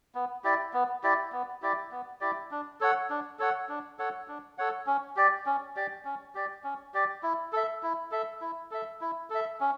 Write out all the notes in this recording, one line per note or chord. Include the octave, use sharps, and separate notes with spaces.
B3
E4 G4 D5
B3
E4 G4 D5
B3
E4 G4 D5
B3
E4 G4 D5
D4
A4 C#5 F#5
D4
A4 C#5 F#5
D4
A4 C#5 F#5
D4
A4 C#5 F#5
C#4
G4 D5
C#4
G4 D5
C#4
G4 D5
C#4
G4 D5
E4
A4 E5
E4
A4 E5
E4
A4 E5
E4
A4 E5
C#4